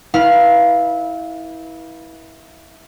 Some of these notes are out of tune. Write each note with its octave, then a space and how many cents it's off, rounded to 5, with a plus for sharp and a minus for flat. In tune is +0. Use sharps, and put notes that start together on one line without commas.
E4 -25 B4 -30 F5 +0